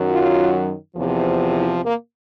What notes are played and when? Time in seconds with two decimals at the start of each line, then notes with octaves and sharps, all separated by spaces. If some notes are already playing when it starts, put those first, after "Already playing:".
Already playing: F#2 D#3 F#3
0.08 F4
0.96 E2 C3 F3
1.56 E4
1.85 A#3